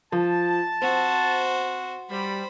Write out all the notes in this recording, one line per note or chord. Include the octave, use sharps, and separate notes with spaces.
F3 A5
C4 F#4 C5
G3 C5 B5